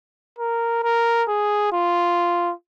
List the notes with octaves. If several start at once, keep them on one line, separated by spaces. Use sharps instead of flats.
A#4
A#4
G#4
F4